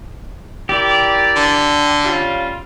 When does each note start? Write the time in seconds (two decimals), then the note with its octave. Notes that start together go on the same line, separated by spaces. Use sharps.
0.69 E4 G4 A#4 D5
1.36 D3
2.03 G3 C#4 F4